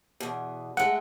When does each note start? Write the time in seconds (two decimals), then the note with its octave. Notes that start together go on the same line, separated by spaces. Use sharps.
0.20 E2 B2
0.77 G#3 A3 F#5